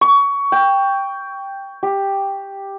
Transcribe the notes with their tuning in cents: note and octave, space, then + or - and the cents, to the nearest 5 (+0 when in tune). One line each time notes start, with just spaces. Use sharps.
C#6 +20
G5 +5
G4 +5